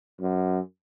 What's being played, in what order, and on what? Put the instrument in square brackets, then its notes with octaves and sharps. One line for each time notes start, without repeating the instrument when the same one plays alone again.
[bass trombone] F#2